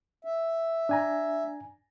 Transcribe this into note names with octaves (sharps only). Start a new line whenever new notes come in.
E5
D4 G#5 A#5